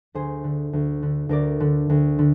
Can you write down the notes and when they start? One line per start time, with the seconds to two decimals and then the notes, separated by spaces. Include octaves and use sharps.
0.15 D2 G#4 C5
0.44 D3
0.73 D2
1.02 D3
1.29 D2 A#4 D5
1.60 D3
1.90 D2
2.19 D3